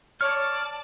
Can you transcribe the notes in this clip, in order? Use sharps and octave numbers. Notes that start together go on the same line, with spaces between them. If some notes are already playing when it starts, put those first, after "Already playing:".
C#5 D5 A5 F6